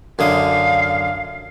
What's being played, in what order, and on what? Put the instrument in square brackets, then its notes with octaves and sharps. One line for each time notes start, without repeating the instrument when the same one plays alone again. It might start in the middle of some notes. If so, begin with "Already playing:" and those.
[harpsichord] F#2 D3 D#6 [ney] F5